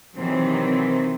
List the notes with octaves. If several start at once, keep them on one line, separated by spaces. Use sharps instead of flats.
C3 D#3 E3 F#3 C4